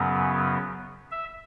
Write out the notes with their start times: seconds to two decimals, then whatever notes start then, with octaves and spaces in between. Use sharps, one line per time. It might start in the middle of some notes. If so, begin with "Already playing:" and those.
Already playing: F#2 C#3 F#3 B3
1.11 E5